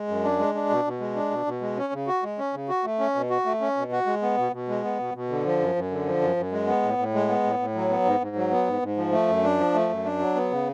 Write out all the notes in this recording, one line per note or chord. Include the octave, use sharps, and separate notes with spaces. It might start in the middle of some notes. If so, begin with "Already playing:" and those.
Already playing: G#3
F#2
D4
G#3
D4
B2
B2
G#3
D4
B2
B2
G#3
C#4
C#3
F#4
G#3
C#4
C#3
F#4
A3
C#4
B2
F#4
A3
C#4
B2
F#4
G#3
B3
B2
B2
G#3
B3
B2
B2
D3
F3
F#2
F#2
D3
F3
F#2
F#2
G#3
B3
A2
A2
G#3
B3
A2
A2
F#3
B3
G#2
G#2
F#3
B3
G#2
G#2
F3
A3
F#2
D4
F3
A3
F#2
D4
F#3
B3
C#3